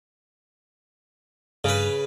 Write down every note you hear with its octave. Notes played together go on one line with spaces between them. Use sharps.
G2 C#3 B4